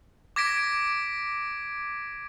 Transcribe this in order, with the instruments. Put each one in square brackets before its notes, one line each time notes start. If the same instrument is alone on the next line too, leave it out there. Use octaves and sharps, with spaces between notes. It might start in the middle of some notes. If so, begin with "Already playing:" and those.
[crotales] D6 G#6 A#6 B6 D7